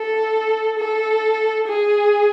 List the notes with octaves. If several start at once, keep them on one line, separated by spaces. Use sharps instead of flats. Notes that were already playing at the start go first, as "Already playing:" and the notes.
Already playing: A4
A4
G#4